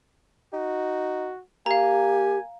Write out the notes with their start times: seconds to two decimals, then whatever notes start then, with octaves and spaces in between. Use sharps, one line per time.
0.53 D#4 F#4
1.66 A#3 G4 F5 G#5 A#5